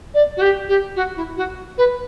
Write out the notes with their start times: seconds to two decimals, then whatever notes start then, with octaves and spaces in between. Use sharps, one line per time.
0.14 D5
0.36 F#4
0.41 G4
0.68 G4
0.95 F#4
1.16 E4
1.37 F#4
1.77 B4